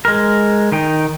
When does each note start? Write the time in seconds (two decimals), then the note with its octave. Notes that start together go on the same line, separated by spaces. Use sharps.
0.05 G#3 A#4
0.72 D#3 D#4 G5